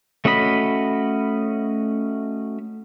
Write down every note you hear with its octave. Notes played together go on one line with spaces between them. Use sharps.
A3 C#4 F#4 D#5 B5